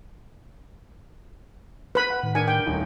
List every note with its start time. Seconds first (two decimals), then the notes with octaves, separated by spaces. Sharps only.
1.95 B4 B5
2.10 F#5
2.23 A2 D#3
2.35 D4 A#4 G#5 C#7
2.48 G5
2.66 D#1 A2 D#4 A#4